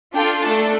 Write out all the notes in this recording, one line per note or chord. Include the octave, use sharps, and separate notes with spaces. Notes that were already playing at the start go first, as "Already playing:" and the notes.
D4 F4 A4 G5
A3 D4 A4 A5